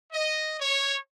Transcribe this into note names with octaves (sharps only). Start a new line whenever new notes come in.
D#5
C#5